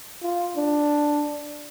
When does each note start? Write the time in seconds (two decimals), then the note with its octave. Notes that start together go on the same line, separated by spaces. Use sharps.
0.22 F4
0.57 D4